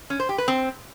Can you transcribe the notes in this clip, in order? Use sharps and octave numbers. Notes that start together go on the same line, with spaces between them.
C#4
C5
G4
B4
C4